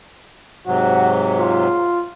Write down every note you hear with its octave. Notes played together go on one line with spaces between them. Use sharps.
G#2 C3 F#3 F#4
F4